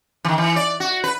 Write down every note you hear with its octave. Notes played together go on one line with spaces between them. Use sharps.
D#3 E3
E3
D5
F#4
B4